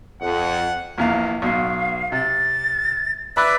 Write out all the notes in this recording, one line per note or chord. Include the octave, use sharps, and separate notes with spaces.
F2 F#5
A#1 E2 F5 A#5
B1 B2 F5
C3 A6
B4 D5 E5 B5 F#6